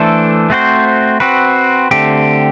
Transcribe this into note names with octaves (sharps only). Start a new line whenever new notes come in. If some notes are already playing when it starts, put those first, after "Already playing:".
Already playing: E3 A3 D4 A4 C5
A3 C4 F#4 C5
C4 F#4 B4
D3 A3 C4 G4